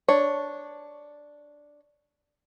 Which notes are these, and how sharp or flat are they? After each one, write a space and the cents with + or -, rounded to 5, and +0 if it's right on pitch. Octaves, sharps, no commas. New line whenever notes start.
D4 +0 C#5 +0